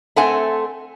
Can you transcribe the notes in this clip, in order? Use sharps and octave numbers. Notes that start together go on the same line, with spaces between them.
A3 C4 A4 F#5 G#5